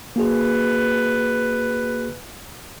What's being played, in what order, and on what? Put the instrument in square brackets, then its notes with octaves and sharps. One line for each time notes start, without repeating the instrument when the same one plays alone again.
[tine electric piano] A#3 F#4 G#4 [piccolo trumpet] B4